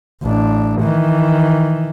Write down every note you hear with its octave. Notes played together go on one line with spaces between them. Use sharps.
A1 D4
D#3 E3